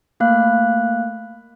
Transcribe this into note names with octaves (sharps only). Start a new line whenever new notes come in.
A3 A#3 F5 F#6